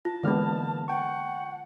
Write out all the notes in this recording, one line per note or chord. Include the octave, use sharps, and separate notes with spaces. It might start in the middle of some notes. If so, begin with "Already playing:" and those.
F4 A5
D3 E3 G#3 A#3 B3 F6
F#5 G5 A5 C#6